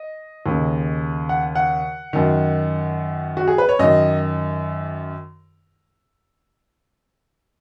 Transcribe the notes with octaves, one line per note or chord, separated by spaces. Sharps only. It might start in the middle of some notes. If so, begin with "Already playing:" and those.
Already playing: D#5
D#2 C#3
F#5
F#5
F#2 D#3
F#4
G#4
B4
C#5
F#2 D#3 D#5